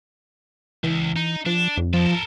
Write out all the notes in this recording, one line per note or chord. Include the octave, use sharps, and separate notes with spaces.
C#2 E3
D#4
F3 D4
F2
F3 A4 A#4